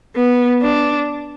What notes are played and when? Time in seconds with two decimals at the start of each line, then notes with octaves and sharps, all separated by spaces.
0.15 B3
0.62 D4